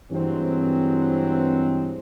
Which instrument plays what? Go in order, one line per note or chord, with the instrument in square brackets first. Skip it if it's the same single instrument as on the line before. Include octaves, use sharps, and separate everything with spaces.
[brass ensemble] G2 E3 F#3 G#3 C4